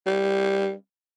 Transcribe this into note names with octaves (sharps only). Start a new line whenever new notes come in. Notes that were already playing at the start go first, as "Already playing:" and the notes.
G3